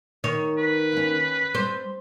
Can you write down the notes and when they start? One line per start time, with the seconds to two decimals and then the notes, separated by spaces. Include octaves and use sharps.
0.24 D#3 C#5
0.58 B4
0.92 D#2 C#4
1.55 G3 C4 C5